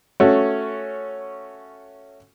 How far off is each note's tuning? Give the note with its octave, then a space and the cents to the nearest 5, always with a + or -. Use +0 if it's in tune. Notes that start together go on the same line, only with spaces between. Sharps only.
A3 +0 C#4 +0 F#4 +0